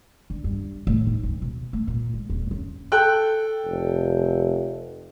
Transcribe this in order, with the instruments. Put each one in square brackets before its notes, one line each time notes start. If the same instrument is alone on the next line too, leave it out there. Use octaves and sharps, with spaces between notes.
[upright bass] D3
G2
A2
D#4
D2
B2
A3
A#2
G#3
D#1
F#2
[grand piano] A4 G5 F#6
[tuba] F1